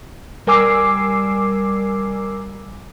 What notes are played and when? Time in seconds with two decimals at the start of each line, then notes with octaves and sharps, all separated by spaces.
0.47 G3 A#4 G#5 D6 E6 C7